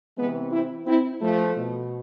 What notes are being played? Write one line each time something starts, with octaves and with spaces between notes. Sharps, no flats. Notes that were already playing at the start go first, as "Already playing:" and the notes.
C3 E3 G#3 B3
C4 E4
C4 E4
F3 A3
B2